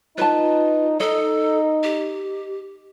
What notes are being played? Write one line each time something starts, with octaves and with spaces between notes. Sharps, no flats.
D#4 F4 B4 A5
D#4 A4 D#5
G4